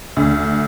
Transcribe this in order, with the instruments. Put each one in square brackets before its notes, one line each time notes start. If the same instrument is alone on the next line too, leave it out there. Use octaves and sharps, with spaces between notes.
[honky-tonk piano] D2